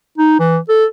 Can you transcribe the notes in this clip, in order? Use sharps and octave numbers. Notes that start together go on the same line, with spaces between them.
D#4
E3
A4